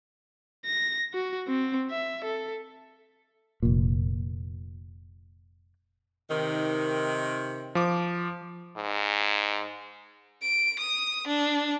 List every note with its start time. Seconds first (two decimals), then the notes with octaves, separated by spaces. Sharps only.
0.65 A#6
1.14 F#4
1.48 C4
1.91 E5
2.24 A4
3.63 F1 A#2
6.30 C3 D#3
7.75 F3 D6
8.77 G#2
10.42 D7
10.79 D#6
11.27 D4